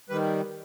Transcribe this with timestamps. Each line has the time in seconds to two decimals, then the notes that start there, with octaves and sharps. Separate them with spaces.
0.10 D#3 G3 B4